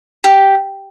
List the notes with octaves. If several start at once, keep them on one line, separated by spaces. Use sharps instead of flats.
G4